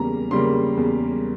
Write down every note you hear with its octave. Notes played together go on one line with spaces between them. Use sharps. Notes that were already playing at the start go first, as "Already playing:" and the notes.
Already playing: E2 C#3 G3 A#3 A#5
C#3 G3 A#3 C6
E2